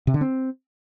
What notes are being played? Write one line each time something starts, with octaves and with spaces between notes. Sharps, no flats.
C3
D3
C4